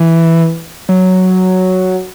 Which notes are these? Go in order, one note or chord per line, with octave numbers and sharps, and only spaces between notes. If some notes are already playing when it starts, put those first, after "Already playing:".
Already playing: E3
F#3